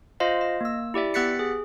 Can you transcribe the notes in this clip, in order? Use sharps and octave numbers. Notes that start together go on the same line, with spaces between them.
F4 C5 D#5 F5
D#5
A#3 E6
E4 G4 D5 E5
B3 G4 F#6 A6 B6 C#7
G#4